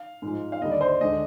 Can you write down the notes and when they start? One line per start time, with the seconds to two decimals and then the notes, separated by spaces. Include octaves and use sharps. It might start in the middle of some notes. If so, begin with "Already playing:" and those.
Already playing: F5
0.22 G#2 F3 G#3
0.52 F5
0.61 D#2 D3 G3 D4 D#5
0.71 D5
0.81 C5
1.01 D2 D3 G#3 D4 D#5